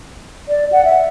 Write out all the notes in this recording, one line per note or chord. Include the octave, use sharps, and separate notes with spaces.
D5
F#5
E5